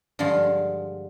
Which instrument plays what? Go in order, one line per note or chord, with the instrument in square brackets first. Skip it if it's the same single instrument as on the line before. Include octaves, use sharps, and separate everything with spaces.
[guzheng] G2 D3 F3 G#3 F4